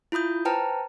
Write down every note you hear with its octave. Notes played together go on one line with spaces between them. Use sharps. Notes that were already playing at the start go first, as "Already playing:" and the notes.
E4 F4 B5 D#6 G6
B4 C5 G5 A5 A#5 F6